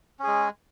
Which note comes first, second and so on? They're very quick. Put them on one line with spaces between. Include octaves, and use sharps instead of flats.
C#4 G#4 G#3